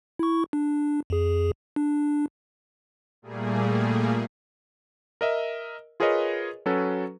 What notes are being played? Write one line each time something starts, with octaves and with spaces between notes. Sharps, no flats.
E4 C#6
D4
F2 G#4
D4
A#2 G3 A3 A#3 G#4
A#4 D#5 E5
F4 G#4 A#4 B4 C#5 D#5
F#3 C#4 F#4 A4 B4